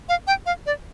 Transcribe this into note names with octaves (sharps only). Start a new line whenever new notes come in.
F5
G5
F5
D5